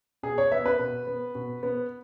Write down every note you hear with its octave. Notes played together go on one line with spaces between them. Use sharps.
B2 G#4
C#5
B3 E5
B4
B2
B3
B2
B3